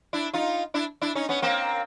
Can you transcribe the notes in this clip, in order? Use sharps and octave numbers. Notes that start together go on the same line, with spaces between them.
D4 E4
D#4 F4
D4 E4
D4 E4
C#4 D#4
B3 C#4
A#3 C4